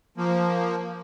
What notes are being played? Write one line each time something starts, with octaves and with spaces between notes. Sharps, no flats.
F3 A#3